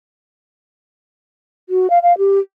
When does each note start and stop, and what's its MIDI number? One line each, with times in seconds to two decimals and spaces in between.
1.69 1.90 66
1.90 1.99 77
2.03 2.16 77
2.18 2.39 67